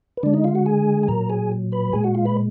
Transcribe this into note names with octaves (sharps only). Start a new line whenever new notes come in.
B4
D3 G#3 D4 D5
D#4 D#5
F4 F5
F#4 F#5
G#4 G#5
G#5
A#2 F#3 A#4 A#5
G#4 G#5
B4 B5
A#2 G#3 G#4 G#5
F#4 F#5
F4 F5
B4 B5